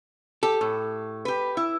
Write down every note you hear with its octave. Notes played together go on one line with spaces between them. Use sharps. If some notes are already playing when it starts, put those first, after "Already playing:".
G4 A4
A2
G4 B4
E4